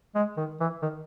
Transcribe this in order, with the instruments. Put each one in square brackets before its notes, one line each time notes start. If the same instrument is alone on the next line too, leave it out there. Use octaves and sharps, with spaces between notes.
[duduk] G#3
D#3
E3
D#3